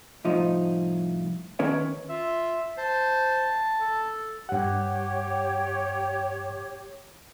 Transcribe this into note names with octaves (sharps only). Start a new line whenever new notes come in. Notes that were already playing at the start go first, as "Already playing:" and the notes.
C2 A2 F3 D#4
D#3 C#4 A#4 B4 C#5
F4 E5
C5 A5
A4
G2 G4 C#5 F#5